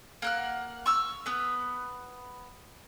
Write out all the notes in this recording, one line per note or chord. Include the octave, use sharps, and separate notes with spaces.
A#3 F#5 F6
C#6 E6 F6
B3 B4